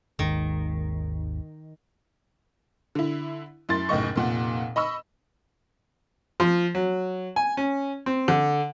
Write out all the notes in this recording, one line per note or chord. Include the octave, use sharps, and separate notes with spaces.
G#1 D#2 G#2 D#3
D3 E4
F#2 E4 C6 A6
F#1 B1 A2 D#5 C#6
F1 A#2 F#5
D#5 B5 C#6 E6
F3
F#3
G#5
C#4
C4
D3